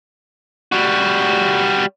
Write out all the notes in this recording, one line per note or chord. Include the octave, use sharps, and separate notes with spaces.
G3 F#4